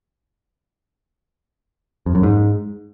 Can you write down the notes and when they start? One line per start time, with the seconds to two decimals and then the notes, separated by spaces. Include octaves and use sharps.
2.06 F2
2.15 F#2
2.23 G#2